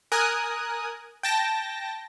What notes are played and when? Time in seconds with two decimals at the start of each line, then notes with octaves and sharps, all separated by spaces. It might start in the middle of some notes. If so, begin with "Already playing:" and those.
0.12 A#4 G#5 D#6 F#6
1.23 G5 A5 A#6